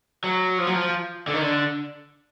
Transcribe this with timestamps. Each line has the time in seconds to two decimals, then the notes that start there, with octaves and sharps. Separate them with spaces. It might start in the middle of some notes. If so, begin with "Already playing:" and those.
0.24 F#3
0.58 F3
0.67 F#3
0.74 F3
1.27 D3
1.34 D#3
1.41 D3